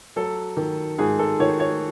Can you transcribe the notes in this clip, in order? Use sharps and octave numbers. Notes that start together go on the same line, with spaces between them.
F#3 A4
D#3
G#2 G#4
A4
D#3 C#5
C#5